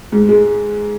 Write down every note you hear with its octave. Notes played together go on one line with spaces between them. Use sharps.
G#2
G#3